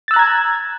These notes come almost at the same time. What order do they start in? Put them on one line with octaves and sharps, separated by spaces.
A6 E6 F#6 A#5 G#6